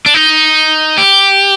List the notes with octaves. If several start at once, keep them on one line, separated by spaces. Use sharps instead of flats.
D4
D#4
G4